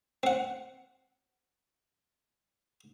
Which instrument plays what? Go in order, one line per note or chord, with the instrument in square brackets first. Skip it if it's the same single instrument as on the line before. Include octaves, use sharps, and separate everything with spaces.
[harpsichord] C4 F#5